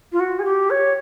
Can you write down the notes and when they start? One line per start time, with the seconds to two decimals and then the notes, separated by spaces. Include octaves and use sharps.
0.12 F4
0.19 F#4
0.38 G#4
0.44 G4
0.69 C#5